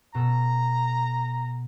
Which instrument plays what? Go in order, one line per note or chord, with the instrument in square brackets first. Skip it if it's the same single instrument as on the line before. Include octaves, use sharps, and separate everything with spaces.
[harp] B2 A4 [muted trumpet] A#5